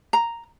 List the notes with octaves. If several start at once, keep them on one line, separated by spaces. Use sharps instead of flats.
A#5